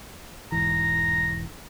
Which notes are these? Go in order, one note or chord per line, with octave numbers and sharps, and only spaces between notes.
E1 G#2 E3 A#5